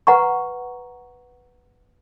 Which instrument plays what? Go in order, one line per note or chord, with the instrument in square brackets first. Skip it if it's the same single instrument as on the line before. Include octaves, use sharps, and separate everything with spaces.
[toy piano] B4 F#5 A#5 C#6